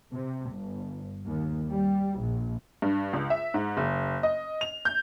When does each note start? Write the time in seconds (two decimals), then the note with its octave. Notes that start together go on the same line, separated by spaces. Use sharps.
0.12 C3
0.50 G1
1.25 D#2
1.69 G3
2.19 A#1
2.82 G2
3.13 C#2
3.30 E5
3.54 G#2
3.77 F#1
4.23 D#5
4.61 F7
4.85 G6